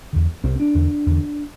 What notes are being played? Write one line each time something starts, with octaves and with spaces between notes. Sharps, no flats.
E2 D3
C2 C3 C4
D4
E2 D3
E2 D3